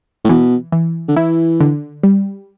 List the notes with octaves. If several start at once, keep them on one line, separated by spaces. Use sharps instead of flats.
A2
B2 E3
E3
D3
E3 E4
D3
G3